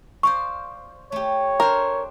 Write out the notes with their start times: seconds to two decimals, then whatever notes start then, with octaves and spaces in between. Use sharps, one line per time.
0.23 C5 D5 F5 C#6
1.12 A3 G4 C#5
1.60 D4 A#4 C5